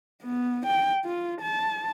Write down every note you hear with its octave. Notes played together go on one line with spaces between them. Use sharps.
B3
G5
F4
A5